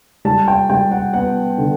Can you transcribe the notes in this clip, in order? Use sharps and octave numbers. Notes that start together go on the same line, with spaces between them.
G3 A5
G5
G3 G5
F#5
B3 F#5
D3